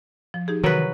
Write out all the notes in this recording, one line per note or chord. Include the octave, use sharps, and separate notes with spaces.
F3
D#4 G4 G#4
C3 D#3 E3 F#3 B4